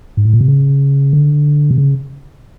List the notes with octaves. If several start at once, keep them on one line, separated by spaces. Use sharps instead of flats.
G#2
A2
A#2
C3
C#3
D3
C3
C#3